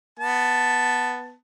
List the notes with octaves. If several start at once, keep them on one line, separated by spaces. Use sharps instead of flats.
B3 A5